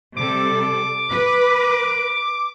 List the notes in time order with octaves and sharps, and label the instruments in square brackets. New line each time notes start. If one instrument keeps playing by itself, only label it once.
[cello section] C3 G3 A4 [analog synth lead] D6
[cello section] B4